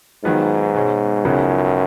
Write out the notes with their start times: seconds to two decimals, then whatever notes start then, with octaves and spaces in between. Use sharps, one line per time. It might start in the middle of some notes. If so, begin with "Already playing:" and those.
0.24 G#2 D#3 F#3 B3 F4
0.74 B2 G#3 C#4
1.25 C#2 F#2 C#3 F3 B3 D#4